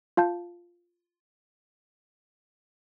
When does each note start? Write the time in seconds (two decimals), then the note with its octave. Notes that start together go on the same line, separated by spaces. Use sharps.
0.17 F4 F5 A5 G6